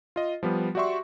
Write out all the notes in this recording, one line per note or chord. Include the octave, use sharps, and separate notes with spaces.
F4 D#5
F3 G3 B3
F#4 G4 D5 E5 C6 C#6